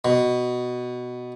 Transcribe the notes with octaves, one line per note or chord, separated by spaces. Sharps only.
B2